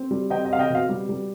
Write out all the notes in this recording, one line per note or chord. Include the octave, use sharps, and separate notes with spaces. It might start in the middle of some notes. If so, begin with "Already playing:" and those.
Already playing: C4
G3
C4 D#5 G5
D#5
C4 F5
D#5 G5
B2 F5
G3
G3